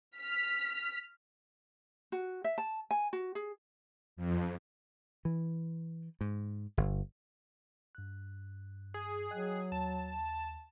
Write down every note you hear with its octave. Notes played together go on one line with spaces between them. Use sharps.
F6 B6
F#4
E5
A5
G#5
F#4
G#4
F2
E3
G#2
G1
G2 F#6
G#4
F#3 D#5 G5 F#6
D#2 A5